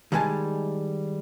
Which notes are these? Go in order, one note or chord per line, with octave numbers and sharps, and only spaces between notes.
D#3 G3 G#3 B4 G#5 A5